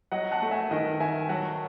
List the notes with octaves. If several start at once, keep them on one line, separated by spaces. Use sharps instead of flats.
F#3 D#5 F#5
F#5 A5
A3
E5 G#5
D#3 D#5 F#5
D#3 E5 G#5
F#3 F#5 A5